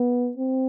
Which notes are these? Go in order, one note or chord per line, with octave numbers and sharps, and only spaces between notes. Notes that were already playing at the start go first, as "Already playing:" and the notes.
Already playing: B3
C4